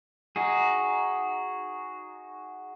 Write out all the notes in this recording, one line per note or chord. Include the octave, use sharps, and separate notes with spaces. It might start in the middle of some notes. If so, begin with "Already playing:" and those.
D#4 F#4 G#4